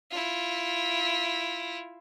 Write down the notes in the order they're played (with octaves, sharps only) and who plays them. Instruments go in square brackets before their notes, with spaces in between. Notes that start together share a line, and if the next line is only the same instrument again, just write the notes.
[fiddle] E4 F4